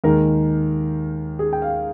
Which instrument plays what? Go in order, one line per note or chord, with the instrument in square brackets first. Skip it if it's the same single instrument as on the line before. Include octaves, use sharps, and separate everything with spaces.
[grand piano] D#2 D#3 G#3 A#4
G#4
G5
F5